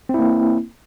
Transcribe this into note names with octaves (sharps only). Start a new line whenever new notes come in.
A#3 C4 E4